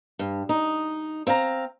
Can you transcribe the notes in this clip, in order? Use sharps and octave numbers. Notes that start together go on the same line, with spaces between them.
G2
D#4
C4 F5 G#5 A#5